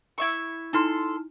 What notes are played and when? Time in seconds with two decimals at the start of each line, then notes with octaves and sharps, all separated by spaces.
0.18 E4 E5 C#6
0.73 D#4 E4 A4 C6 F6